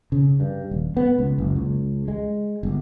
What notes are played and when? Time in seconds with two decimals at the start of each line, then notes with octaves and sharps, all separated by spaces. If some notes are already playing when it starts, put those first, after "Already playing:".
0.12 C#3
0.40 G2
0.71 D#1
0.97 B3
1.18 C#2
1.38 F#1
1.56 C#2
2.08 G#3
2.63 G1